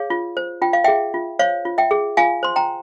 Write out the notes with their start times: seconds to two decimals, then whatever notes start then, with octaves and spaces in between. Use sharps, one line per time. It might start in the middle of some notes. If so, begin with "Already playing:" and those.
Already playing: G#4 C#5 F5
0.10 F4
0.37 C5
0.62 F4 G5
0.73 F5
0.84 G#4 E5 G5
1.14 F4
1.39 C5 C#5 F5
1.65 F4
1.78 E5 G5
1.91 G#4
2.17 F4 F5 G#5
2.43 C5 C6
2.56 G5 A#5